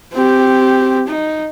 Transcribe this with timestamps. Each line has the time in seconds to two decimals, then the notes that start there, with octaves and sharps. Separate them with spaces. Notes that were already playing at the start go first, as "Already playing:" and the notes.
0.13 C4 G4
1.08 D#4